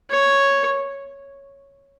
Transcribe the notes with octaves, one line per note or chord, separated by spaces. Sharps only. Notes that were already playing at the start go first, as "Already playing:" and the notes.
C#5